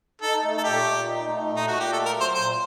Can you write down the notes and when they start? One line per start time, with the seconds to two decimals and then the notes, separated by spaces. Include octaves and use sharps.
0.22 D#4 A4
0.43 A3
0.57 A4
0.64 A#2 G4
0.86 A#2
1.07 D#4
1.28 A3
1.49 A#2
1.56 D#4
1.68 A#2 F#4
1.80 G4
1.92 A3 A4
2.06 A#4
2.13 F#3
2.20 C5
2.34 A#2 C5